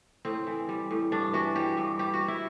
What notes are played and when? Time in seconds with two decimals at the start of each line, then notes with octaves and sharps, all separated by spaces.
0.25 A2 C4
0.47 E3
0.69 G3
0.91 A2
1.12 G2 D4
1.33 E3 F#4
1.55 G3 G4
1.77 G2
1.99 G3 G4
2.14 F#4
2.21 G3
2.28 E4